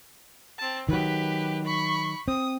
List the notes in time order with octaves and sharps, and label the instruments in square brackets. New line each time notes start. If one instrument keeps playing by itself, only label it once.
[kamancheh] C4 A5
[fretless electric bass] D#3 F#3 [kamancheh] G4 B4
[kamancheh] B5 C#6
[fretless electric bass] C4 [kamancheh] D#6